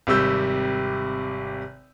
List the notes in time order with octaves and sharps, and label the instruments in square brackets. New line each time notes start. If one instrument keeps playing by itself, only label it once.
[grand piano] G#1 C3 G3 E6 G6